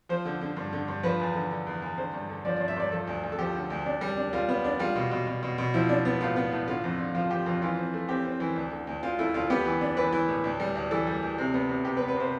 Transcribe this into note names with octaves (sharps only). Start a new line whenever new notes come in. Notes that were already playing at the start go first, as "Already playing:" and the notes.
F3 C5
D3
D3
G2
D3
G2
F3 B4
E2
D3
D3
E2
E2
D3 C5
G2
D3
F3 D5
D5
G2
E5
G2 D5
F3 A4
D2
D2
A4
F3 G4
D3
D2
D4
G3
D4
G3 F4
B3
D4
G3 F4
B2
B2
B2
B2
B2
F3 E4
D4
B3
A2 F4
B3
A2
D3 F4
F2
D3
F3 F4
F3 G4
F2 F4
E3 F4
C4
A3
C4 G4
C4
E3
D2
D3
D2
D2 F4
A3 E4
D2 F4
B3 G4
E3
D4
E3 B4
E3
A2
D2
G3
D2
E3 A4
G3
D2
C3
B3
C3
C3 G4
B4
B3
B4
C3 C5